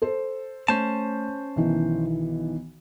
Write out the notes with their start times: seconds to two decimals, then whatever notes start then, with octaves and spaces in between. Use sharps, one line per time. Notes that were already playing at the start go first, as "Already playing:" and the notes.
0.02 A4 C5
0.68 A3 C#4 C5 A5
1.56 B1 D#3 E3